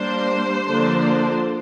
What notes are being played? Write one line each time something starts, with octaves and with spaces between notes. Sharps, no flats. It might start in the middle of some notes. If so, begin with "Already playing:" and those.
Already playing: G3 A#3 D4 C5
D3 F3 A#3 D4